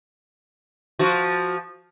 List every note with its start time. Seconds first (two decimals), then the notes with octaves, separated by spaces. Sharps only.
0.99 F3 F#4